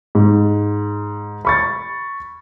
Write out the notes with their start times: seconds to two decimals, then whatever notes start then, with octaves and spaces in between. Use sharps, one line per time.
0.15 G#2
1.45 B5 C#6 A6